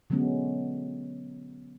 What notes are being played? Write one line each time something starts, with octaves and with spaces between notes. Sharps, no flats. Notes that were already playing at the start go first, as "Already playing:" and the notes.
D3 F#3 G#3 B3 C#4